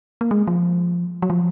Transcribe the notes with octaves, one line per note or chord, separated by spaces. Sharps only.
A#3
G#3
F3
F#3
F3